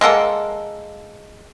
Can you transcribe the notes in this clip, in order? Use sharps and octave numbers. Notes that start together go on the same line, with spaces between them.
G#3 A#3 A4 F#5